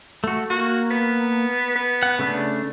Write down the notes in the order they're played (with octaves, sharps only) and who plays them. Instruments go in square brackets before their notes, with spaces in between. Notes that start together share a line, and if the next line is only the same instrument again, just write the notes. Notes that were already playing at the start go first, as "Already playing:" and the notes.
[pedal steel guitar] A3 F#4
[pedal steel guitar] A#3 [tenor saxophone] F#4
[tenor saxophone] B3
B3
[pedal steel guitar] F#5
C#3 A3 D4